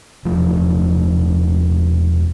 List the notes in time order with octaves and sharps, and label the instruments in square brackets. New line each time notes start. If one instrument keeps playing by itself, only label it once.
[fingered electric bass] E1 F3 A3